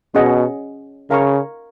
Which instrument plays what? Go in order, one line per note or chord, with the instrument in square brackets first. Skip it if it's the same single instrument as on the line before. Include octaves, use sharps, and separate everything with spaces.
[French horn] B2 [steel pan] C#4 G#4 D#5 F#5
[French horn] C#3 [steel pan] A#4 F5 A#5 C#6